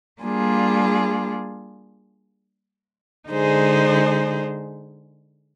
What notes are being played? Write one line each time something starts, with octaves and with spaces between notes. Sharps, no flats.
G3 A#3 D4 F4 G#4
D3 G#3 D#4 G#4 C5